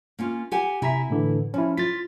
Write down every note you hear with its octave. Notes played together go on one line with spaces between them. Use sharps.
A#3 C#4 F4
G4 F#5 G#5
C3 E4 E5 G#5 A#5 B6
A2 D3 E3
F3 C#4 E4
F4 A6 B6